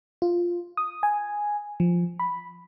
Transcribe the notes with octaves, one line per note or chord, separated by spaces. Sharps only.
F4
D#6
G#5
F3
B5